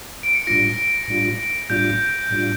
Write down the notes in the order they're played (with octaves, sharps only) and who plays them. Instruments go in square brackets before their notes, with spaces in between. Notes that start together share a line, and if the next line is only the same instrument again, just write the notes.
[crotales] D7
C#7
[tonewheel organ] A2 G3 D4 F4 [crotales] A#6
[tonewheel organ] A2 G3 D4 F4
[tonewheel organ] A2 G3 D4 F4 [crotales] G6
[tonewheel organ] A2 G3 D4 F4